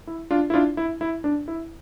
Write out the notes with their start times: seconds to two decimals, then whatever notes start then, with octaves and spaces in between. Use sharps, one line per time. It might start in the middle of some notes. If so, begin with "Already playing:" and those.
0.07 E4
0.31 D4 F4
0.50 E4
0.54 D4 F4
0.77 E4
1.01 E4
1.24 D4
1.48 E4